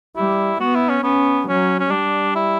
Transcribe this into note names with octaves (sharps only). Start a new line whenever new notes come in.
G3 E4
B3 F#4
E4
C#4
B3 C#4
F#3 C#4
C#4
G3 D4
E4